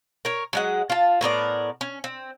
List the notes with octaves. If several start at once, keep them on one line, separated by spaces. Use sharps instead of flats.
A#4 C#5
F#3 G#3 F#5
F4 A5
A2 B3 A#4 D5
C#4
C4